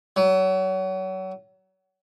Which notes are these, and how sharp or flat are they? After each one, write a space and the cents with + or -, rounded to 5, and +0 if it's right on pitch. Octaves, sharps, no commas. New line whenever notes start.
F#3 +30